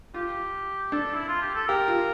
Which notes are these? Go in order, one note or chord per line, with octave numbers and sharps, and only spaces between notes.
F4 G4
D4 A4
E4
F4
G4
A4
G4 A#4
F4